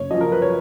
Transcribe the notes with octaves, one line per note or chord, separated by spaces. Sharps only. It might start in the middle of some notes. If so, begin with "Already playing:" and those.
Already playing: F#1 C#5
F#2 F3 D#5
A#4
B4
C#5